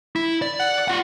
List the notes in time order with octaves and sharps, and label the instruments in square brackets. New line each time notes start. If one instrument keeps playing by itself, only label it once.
[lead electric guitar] E4
D5
[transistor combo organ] F#5
[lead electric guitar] F4 F#5